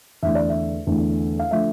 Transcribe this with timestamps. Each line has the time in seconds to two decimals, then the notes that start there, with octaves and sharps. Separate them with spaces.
0.23 E2 D3 A3 E5
0.35 D5
0.49 E5
0.87 E2 D3 A3
1.39 F5
1.51 D3 F3 A3 E5